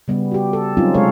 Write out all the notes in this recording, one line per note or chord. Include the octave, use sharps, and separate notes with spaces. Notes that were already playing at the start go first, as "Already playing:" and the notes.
C#3 G3 B3
F#4 G4
A4
F#3 G3 C4 C#4 D#4 F4
C3 G#3 A4 C#5 F5